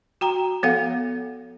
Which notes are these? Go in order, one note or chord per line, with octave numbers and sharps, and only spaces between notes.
F#4 G5 A#5
F3 B3 A4 F5 F#5